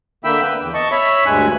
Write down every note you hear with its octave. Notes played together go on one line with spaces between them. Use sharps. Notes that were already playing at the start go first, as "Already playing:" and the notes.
D3 A#3 E5 G5 B5 E6
B4 G5
E2
D#5 A5 C#6
C#5 E5 B5
D2 G2 G#3 G#5 F#6